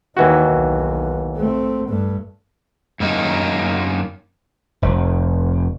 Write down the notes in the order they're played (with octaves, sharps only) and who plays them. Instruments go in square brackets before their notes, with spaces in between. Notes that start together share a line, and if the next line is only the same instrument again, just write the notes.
[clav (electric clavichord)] D#2 E3 F#4 [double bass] D#4
[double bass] B1
A3 C4
G2 A3
[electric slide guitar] F#2 A#3 D#4
[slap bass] F1